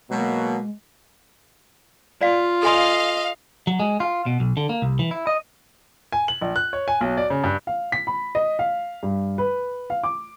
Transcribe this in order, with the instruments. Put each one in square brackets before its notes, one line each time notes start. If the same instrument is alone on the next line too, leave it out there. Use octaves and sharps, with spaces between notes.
[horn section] B2 [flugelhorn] F#3 [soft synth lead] G#3 [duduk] A#3
[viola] F4 [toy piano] D5 F5
[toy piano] A4 G#5 C6 [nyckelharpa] D#5 [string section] F5
[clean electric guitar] F#3
G#3
F4
B2
B1
D3
A#3
C2
E3
E4
D#5
[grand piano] G#5
F#7
A#1
F#6
C#5
G#5
B1
D5
C#3
G2
[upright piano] F5
B6
B5
D#5
F5
G2
B4
F5
D6